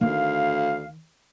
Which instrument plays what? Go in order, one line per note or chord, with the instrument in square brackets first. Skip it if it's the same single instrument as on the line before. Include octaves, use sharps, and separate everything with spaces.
[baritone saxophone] D2 [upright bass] D#3 E4 [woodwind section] F5